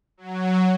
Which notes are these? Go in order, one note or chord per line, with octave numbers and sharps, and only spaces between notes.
F#3